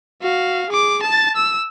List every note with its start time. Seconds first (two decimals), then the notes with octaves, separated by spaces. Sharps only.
0.22 F#4 F5
0.70 G#4 D6
1.03 A5 A6
1.36 E6